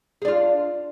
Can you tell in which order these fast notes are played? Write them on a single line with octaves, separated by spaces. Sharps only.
G#4 D4 F4